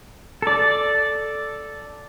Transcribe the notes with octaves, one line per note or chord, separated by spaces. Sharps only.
A4 D5